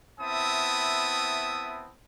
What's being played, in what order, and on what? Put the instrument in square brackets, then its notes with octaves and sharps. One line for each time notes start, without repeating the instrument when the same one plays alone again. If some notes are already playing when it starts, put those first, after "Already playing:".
[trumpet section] B3 C4 E4 E5 A5 D#6